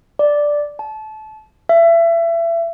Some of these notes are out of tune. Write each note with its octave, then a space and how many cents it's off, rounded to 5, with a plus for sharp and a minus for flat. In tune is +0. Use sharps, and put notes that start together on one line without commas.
D5 +0
A5 -25
E5 +30